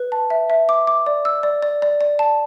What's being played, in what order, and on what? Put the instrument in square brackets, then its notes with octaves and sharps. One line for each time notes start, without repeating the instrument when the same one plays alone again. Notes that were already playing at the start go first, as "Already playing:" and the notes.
Already playing: [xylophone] B4
A5
E5
E5
D6
D6
D5
E6
D5
D5
D5
D5
A5